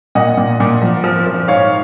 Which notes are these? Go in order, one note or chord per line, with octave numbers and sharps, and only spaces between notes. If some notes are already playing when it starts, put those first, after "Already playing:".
A#2 D#5 F#5
A#2
A#2
F3
F3
F3
G#2 C#5 F5